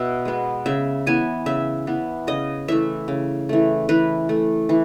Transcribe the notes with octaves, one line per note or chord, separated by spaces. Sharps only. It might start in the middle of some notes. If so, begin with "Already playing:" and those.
Already playing: B2 B3 E5
G#3 B3
C#3 E5
E3 B3 G#5
C#3 E5
E3 B3
C#3 D#5
E3 A3 E5
C#3
E3 A3
E3 B4
A3
E3